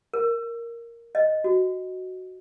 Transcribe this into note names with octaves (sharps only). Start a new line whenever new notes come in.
A#4
D#5
F#4